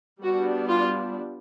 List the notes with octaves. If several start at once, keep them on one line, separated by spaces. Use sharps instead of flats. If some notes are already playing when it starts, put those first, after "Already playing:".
G3 B3 D4 F#4
F4